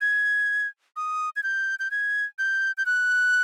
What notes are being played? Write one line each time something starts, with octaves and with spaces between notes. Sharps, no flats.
G#6
D#6
G#6
G6
G6
G#6
G6
G6
F#6